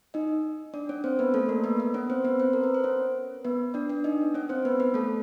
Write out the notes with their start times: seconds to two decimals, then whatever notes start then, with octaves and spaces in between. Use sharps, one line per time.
0.14 D#4 D#5
0.74 D4 D5
0.89 C#4 C#5
1.04 C4 C5
1.19 B3 B4
1.34 A3 A4
1.49 A#3 A#4
1.64 B3 B4
1.79 B3 B4
1.94 C#4 C#5
2.10 C4 C5
2.24 B3 B4
2.40 C4 C5
2.53 A#4
2.64 B4
2.74 C5
2.84 C#4 C#5
3.45 B3 B4
3.74 D4 D5
3.89 D4 D5
4.04 D#4 D#5
4.34 C#4 C#5
4.49 C4 C5
4.65 B3 B4
4.80 B3 B4
4.94 A3 A4